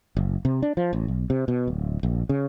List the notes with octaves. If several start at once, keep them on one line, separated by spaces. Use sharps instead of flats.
F#1
C3
D4
F3
A1
B1
C3
B2
D1
A#1
C#3